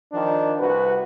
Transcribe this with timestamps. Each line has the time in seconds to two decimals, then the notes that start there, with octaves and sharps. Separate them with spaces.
0.13 D#3 F3 D4
0.60 C2 F#4 B4